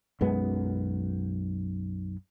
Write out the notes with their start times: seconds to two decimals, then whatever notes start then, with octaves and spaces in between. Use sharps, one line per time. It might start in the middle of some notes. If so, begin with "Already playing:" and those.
0.21 B1 F#2 G#3 B3